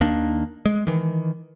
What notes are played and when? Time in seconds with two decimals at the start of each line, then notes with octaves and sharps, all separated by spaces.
0.01 D#2 D#3 A#3 D4
0.66 G#3
0.87 D#3 E3